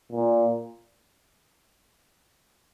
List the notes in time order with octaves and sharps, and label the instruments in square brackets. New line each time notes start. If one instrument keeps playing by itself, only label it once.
[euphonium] A#2